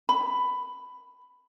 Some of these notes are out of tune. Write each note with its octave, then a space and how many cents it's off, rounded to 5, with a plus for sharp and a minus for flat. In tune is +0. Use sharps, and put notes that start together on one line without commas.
B5 +10